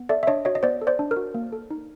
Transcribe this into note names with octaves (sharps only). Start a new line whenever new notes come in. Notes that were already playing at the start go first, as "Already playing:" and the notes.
Already playing: B3
A4 D5 E5
E5
D4 C#5 D#5
F#4 C#5 D#5
D#5
B3 C5 D5
A4
C5 D5
D4
A#4
F#4
A#3
A4
D#4